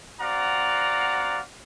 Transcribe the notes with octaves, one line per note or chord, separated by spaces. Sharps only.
C4 F#4 D5 F5 F#5 A#5